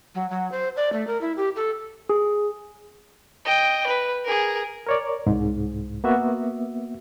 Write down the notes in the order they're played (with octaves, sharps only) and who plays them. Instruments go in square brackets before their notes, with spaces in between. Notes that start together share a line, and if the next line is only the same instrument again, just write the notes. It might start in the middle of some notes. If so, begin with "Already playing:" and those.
[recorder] F#3
F#3
C5
D5
A3
A#4
E4
G4
A4
[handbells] G#4
[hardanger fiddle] D#5 G5
B4
G#4 A#4
[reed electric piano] A#4 C#5 D5
C2 G#2
A#3 B3 F#4 E5